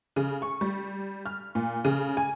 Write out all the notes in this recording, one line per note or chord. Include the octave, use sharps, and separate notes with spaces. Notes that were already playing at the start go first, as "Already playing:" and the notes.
C#3
C#6
G3
F6
A#2
C#3
G#5